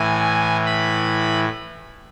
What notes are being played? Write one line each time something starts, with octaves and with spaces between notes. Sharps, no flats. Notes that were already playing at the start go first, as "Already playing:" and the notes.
Already playing: A2 E3 G#5
B5